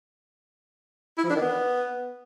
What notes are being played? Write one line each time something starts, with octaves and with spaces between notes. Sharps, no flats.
E4
F3
D4
D#3
B3